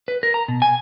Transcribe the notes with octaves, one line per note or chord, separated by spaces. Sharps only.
B4
A#4
A#5
B2
G#5